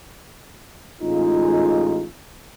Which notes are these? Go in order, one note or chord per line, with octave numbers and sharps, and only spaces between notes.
A1 G#3 D#4 F4